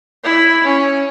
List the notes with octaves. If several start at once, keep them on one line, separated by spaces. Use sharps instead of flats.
E4
C#4